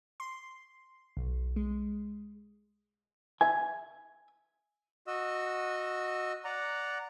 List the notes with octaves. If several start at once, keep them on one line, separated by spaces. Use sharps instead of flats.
C6
B1
G#3
E5 G#5
F#4 D#5 E6
D5 F#5 A#5